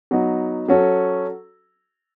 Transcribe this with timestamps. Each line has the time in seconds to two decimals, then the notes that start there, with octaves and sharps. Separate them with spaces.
0.11 F#3 B3 D#4
0.69 F#3 C#4 F#4 A4